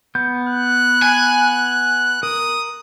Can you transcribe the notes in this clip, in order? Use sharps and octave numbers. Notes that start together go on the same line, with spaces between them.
B3 G6
F#6
G#5
A#4 D#6